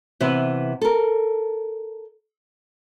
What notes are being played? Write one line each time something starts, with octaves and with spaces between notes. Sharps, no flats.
C3 E3 B3 B4
A4 A#4